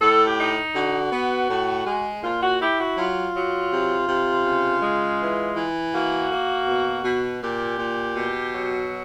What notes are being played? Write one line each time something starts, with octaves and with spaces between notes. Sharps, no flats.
A2 A4
G4
D#4
D3 F#4
B3
A2
G#3
A#2 F4
F#4
E4 G4
F#4
F#3 F4
F#3
C3
C3
C#3
G#3
E3
E3
A#3 F#4
A#3
B2
B2
A#2 G4
A#2
B2
F#3